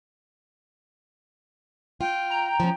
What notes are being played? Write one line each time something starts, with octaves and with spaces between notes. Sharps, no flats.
F4 G5
A#5
F3 C#4